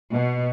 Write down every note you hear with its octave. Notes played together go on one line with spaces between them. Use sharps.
B2